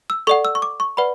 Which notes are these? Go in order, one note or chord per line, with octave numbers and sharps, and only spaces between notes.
E6
A4 D5 F#5 C#6
E6
C#6
D6
C#6
B4 D5 F#5 B5